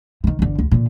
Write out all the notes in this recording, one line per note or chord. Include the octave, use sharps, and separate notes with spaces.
D#3 E3
G1 D3
D2
A#2 D3